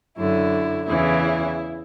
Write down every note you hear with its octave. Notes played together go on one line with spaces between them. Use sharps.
F#2 D3 E4
E2 C#3 E3 E4